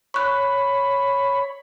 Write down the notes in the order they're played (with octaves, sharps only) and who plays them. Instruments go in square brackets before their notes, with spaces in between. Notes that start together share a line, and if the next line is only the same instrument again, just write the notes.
[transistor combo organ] C#5 B5 [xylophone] C#6 F#6